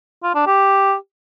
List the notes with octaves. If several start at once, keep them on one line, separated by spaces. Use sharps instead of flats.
F4
D4
G4